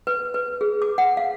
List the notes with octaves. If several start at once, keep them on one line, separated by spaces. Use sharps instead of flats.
B4
B4
G#4
D6
F#5
F5